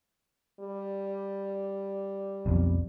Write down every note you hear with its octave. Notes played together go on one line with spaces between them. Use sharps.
G3
B1 F2